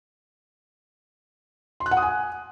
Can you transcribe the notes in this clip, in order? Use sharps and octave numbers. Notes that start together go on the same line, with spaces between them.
C6
F#6
F#5
D#6
G#5